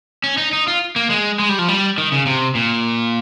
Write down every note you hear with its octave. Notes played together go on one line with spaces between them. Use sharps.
C#4
D#4
D#4
F4
A#3
G#3
G#3
G3
F3
G3
D#3
C#3
C3
A#2